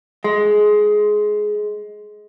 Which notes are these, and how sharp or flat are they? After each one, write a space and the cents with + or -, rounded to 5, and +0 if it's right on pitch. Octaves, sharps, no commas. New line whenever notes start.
G#3 +15